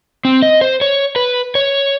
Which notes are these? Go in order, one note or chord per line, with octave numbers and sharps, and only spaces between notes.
C4
D#5
C5
C#5
B4
C#5